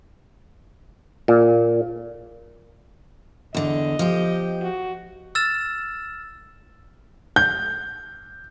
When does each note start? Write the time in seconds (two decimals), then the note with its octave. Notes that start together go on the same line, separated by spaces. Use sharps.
1.28 A#2
3.55 E2 D3 D#5
3.99 F3 G4
4.61 F#4
5.35 E6 F6 A6 E7
7.36 G6